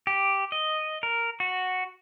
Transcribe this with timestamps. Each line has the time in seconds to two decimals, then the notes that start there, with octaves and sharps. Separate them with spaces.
0.07 G4
0.52 D#5
1.03 A#4
1.40 F#4